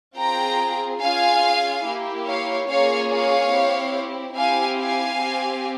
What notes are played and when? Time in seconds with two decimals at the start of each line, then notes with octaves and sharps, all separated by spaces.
0.17 C4 F4 G#4 G5 A#5
1.01 C#4 F4 G#4 F5 G#5
1.85 A#3 E4 G4
2.26 C#5 F5
2.68 A#3 C#4 F4 G#4 C#5 F5
3.10 C#5 F5
3.52 C4 E4 G4
4.35 C4 E4 G4 F5 G#5
4.77 F5 G#5
5.19 C4 G4